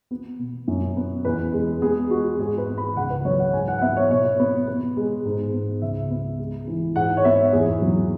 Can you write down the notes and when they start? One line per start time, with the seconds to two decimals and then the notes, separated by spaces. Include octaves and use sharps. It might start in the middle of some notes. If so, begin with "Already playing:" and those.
0.11 B3
0.39 B2
0.68 F#2
0.96 B3
1.25 E2 B4
1.54 G#3
1.82 B3 G#4
2.11 G#3 F#4
2.39 G#2 G#4
2.58 B4
2.68 B3
2.78 B5
2.96 C#2 F#5
3.10 B4
3.25 F#3 C#5
3.39 F#5
3.53 G#2 G#5
3.68 F#5
3.78 F#5
3.82 B3 E5
3.96 C#5
4.11 B2 C#5
4.39 B3
4.68 B3
4.97 G#3
5.25 G#2
5.53 B3
5.82 C#2 E5
6.10 B3
6.39 G#3
6.67 E3
6.96 G#2 F#5
7.17 C#5
7.25 B3 E5
7.53 E2 G#4
7.82 F#3